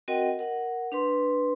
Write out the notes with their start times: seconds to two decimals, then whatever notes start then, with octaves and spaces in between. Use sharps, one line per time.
0.08 C4 F#4 A#4 D#5 F#5 G5
0.39 A#4 F#5
0.92 D4 B4 C6